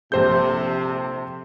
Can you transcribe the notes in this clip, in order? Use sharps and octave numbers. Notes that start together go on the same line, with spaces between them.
A#1 C3 G4 A4 C5 G6